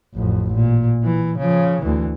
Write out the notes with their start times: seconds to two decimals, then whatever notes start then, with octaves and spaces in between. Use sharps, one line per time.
0.14 A1 F2
0.54 A#2
1.04 E3
1.38 C#3 F3
1.82 D2 E3